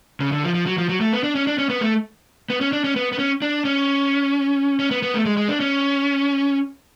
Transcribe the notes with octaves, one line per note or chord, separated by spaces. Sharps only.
C#3
D3
F3
F3
F#3
F3
F#3
A3
B3
D4
C#4
D4
C#4
B3
A3
B3
C#4
D4
C#4
B3
B3
C#4
D4
C#4
C#4
B3
B3
A3
G#3
G#3
D4
C#4